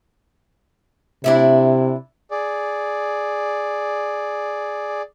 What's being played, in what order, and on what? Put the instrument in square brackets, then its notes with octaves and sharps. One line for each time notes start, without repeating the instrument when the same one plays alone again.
[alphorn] C3 [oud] D4 E4 E5
[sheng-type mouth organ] G#4 D5